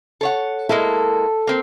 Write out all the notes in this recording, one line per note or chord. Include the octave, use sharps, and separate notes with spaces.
A4 C#5 F#5
G#3 A#3 E4 A4
A#3 C4